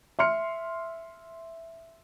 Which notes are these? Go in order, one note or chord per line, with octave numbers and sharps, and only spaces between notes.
E5 C6 F6 C#7